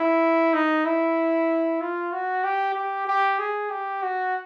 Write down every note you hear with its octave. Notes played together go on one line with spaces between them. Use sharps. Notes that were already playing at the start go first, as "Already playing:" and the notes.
Already playing: E4
D#4
E4
F4
F#4
G4
G4
G4
G#4
G4
F#4